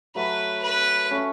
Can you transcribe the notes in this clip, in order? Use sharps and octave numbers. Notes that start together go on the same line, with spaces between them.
F#3 A3 B4
B4
A3 C#4